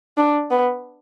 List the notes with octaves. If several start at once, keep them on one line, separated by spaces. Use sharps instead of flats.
D4
B3